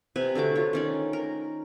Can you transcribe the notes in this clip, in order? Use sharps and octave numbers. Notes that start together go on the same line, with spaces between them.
C3 B4 G#5
D3 A3 F#4 D6
F4 C#5
D#3 C#4 D5
A#4